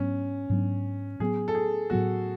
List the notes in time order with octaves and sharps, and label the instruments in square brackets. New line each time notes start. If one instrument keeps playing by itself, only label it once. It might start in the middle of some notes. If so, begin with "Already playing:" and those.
Already playing: [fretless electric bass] G#2 F#3 B3 D4 [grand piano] C#4
[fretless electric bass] G#2 F#3 B3 D4
[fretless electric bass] A2 F#3 B3 [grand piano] G#4
[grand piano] A4
G#4
[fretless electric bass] A2 F#3 B3 [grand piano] F#4